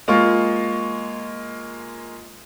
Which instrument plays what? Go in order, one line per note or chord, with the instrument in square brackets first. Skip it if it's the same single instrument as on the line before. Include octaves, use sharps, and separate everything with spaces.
[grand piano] G#3 A#3 F4 C#6